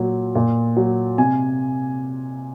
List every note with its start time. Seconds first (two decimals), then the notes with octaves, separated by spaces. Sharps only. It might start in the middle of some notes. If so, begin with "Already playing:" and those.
Already playing: A#2 F#3
0.35 A#2
0.77 F#3
1.18 C3 G#5